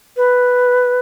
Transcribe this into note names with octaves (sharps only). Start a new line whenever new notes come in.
B4